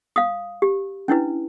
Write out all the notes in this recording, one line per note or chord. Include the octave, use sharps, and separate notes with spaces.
F5 D#6
G4
C#4 D4 E4 B4